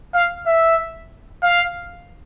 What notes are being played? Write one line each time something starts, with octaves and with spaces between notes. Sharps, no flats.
F5
E5
F5